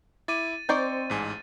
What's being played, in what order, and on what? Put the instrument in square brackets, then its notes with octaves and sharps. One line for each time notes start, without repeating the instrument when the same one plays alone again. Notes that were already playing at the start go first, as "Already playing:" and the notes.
[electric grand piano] E4 D6 [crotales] A6 D#7
[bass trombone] C4 [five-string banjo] D#4 C5 D5 [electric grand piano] C#6 G6
[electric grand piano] A1 G#2 G#5